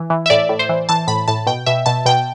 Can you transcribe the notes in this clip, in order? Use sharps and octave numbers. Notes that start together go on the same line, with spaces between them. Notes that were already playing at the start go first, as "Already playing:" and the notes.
Already playing: E3
E3
E5
A2 D5
A2
C5
E3
E3 A5
A2 B5
A2 A5
B2 G5
B2 E5
B2 A5
B2 G5